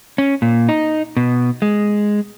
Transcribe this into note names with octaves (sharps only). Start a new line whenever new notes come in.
C#4
A#2
D#4
B2
G#3